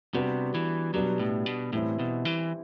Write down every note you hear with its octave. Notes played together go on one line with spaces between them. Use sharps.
C3 G3 B3 D4 F#4
E3
B2 F#3 G3 B3 D4 G4
A2
B2
A2 E3 G3 C4 E4
B2
E3